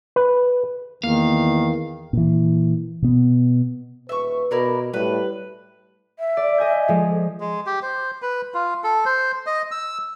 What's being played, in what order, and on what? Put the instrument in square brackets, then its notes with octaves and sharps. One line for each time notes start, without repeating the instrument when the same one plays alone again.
[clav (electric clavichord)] B4
[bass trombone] E2 [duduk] D#3 [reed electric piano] A#3 [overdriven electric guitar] F5
[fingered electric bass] A#2 E3
B2 B3
[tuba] D#1 [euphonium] B4 [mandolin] E5 C#6
[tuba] B2 [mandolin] E4 A#4 D5
[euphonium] A2 [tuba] G3 [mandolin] B4
[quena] E5
[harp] D5
D#5 G#5 G6
F3 G#3
[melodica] G#3
G4
C5
B4
F4
A4
C5
D#5
E6